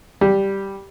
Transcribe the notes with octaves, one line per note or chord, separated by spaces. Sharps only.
G3